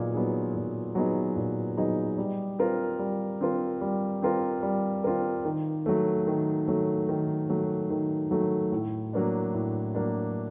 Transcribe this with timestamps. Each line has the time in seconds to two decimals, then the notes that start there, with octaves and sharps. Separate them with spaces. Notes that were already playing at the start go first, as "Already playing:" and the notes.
Already playing: A#2 F#3 B3 D#4 G#4
0.13 F#3 B3 D#4 G#4
0.55 A#2
0.95 F#3 B3 D#4 G#4
1.36 A#2
1.77 F#3 B3 D#4 G#4
2.18 G3
2.59 C4 F4 A#4
2.99 G3
3.41 C4 F4 A#4
3.81 G3
4.22 C4 F4 A#4
4.63 G3
5.04 C4 F4 A#4
5.45 D#3
5.86 F#3 A3
6.27 D#3
6.68 F#3 A3
7.09 D#3
7.49 F#3 A3
7.90 D#3
8.31 F#3 A3
8.72 A2
9.13 F#3 A#3 D4
9.54 A2
9.95 F#3 A#3 D4